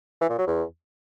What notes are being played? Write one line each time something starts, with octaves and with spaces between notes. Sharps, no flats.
E3
A#2
F#3
E2